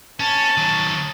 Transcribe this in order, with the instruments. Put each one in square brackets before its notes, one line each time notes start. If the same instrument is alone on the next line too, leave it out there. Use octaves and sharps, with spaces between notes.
[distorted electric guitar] C#4 [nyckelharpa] A5
[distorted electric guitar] D#3 F#3